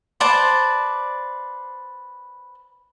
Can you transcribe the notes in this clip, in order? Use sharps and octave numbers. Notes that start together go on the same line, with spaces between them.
B4 C5 D5 A5